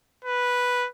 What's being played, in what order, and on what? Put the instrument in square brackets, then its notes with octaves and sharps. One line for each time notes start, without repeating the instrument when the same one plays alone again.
[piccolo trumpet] B4